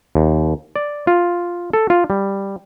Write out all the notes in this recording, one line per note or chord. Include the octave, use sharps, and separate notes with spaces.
D#2
D5
F4
A4
F4
G3